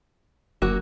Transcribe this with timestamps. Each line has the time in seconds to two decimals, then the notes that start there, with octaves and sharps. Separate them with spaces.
0.62 G1 F#3 A#3 F#4